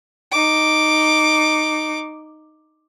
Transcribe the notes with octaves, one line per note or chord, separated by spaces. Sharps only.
D#4 D6